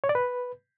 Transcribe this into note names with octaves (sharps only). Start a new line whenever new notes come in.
C#5
D5
B4